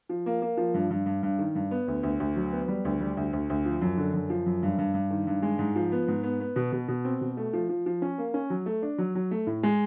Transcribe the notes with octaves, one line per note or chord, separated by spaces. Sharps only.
F3
A#3
A#3
F3
G2
G2
G2
G2
D#3
G2
B3
D2
D2
D2
F#3
B3
G3
D2
G3
D2
D2
D2
F3
F#2
D3
F#2
F3
F#2
G2
G2
G2
D#3
G2
G#3
G#2
F3
B3
G#2
B3
B3
B2
B2
B2
C4
B2
A3
F3
F3
F3
C#4
A#3
C#4
F#3
A3
D4
F#3
F#3
A3
A2
G#3